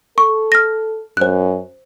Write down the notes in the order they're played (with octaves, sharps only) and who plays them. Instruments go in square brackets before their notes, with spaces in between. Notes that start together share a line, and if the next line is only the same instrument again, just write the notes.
[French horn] A4 [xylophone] C#6
[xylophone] F6 A#6
[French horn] F#2 [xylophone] C5 F#6